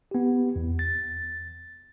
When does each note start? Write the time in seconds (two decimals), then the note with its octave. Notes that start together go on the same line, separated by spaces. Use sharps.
0.11 B3 G4
0.56 E2
0.79 A6